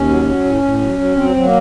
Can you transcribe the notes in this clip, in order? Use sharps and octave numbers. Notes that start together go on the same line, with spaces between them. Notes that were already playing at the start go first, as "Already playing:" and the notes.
Already playing: D#2 C#4
F#3
F#3
A2
A2
F#3
F#3
F#3 C4
F#3
A#3